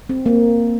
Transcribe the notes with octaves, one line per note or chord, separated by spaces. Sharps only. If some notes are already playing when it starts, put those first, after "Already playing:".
C4
A#3